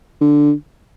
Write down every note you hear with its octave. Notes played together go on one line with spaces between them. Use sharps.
D3